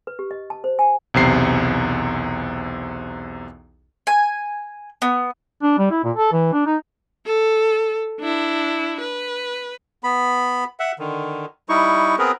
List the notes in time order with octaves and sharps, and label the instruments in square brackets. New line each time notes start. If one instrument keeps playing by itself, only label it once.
[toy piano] B4
G4
D#5
A5
C5
G#5
[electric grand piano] B1 E2 C3 C7
[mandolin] G#5
B3
[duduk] D4
G3
E4
A#2
A4
E3
D4
D#4
[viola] A4
D4 E4
B4
[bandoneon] B3 B5
E5 F#5
D3 D#3
G3 D#4 E4 C#6
B3 C4 G#4 A#4 B4